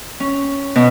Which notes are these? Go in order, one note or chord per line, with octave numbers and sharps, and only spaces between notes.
C#4
B2